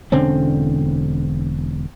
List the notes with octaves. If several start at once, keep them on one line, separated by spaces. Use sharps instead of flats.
E1 D3 C4 C#4